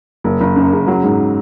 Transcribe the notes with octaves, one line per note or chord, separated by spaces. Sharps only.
F#1
F#1
F#2
C#3
F#3
G#2